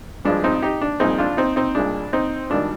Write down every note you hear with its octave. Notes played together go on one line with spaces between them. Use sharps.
G#1 G2 F3 G#3 D4
C4 D#4
D#4 G4
D4
C2 A#2 F3 G#3 C4 D#4
D4 F4
C4 D#4
C4 D#4
C2 A#2 G#3 D4
C4 D#4
G#1 D#3 G3 D4